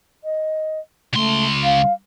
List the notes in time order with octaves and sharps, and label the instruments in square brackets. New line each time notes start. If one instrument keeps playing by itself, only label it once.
[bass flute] D#5
[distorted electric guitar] C#2 C6 [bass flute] A3
[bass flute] F5